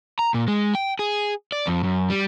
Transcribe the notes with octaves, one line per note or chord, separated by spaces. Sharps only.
A#5
A#2
G#3
G5
G#4
D5
F2
F#2
G3